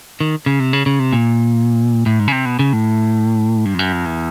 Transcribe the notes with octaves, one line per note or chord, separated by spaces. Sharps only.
D#3
C#3
C3
C#3
C#3
C3
A#2
A2
G#2
C#3
C3
B2
C#3
A2
G2
F2
F#2
F2
E2